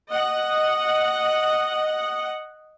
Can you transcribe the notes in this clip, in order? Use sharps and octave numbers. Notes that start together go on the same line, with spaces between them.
D#5 F#5